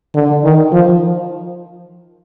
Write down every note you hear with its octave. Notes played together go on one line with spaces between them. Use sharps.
D3
D#3
F3